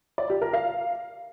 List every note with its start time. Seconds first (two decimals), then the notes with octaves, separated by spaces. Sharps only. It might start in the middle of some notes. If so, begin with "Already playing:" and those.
0.18 D5
0.30 G4
0.42 A#4
0.53 F5